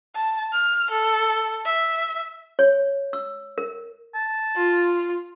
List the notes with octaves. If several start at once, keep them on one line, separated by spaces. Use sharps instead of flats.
A5
F6
A4
E5
C#5
E6
A#4
A5
F4